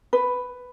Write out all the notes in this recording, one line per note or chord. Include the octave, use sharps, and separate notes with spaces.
B4